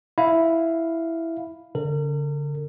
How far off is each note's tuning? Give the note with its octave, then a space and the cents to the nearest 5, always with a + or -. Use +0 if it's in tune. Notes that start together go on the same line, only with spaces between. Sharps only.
E4 +0 F5 +0
D3 -30 A#4 -40